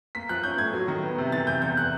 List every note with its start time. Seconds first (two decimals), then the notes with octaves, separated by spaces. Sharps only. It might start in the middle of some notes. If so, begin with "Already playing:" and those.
0.15 A#3 B6
0.29 F3 F#6
0.43 C#4 G6
0.58 A2 G#6
0.74 F#3
0.88 D#3
1.03 B3
1.18 C3
1.32 E3 A6
1.47 C3 G6
1.62 E2 G6
1.77 F#6